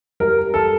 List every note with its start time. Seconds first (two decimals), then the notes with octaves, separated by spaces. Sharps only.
0.20 G3 A#4
0.54 A4